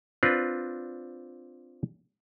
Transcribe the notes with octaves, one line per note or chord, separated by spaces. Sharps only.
C4 D4 F4 B4